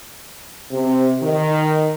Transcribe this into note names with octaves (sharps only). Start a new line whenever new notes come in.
C3
D#3